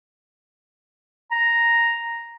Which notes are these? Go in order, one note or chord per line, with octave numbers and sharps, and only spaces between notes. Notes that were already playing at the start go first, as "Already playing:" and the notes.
A#5